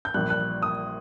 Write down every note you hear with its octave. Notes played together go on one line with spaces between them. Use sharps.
G6
A#1 A#2 G3 F#6
F#6
D#6